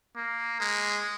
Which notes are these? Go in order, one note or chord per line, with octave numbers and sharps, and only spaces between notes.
A#3
G#3